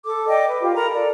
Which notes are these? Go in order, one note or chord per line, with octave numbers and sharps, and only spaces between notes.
A4 D6
D5 D#5 G5 D6
B4
F4 G4
A4 A#4 A#5 B5
A4 D5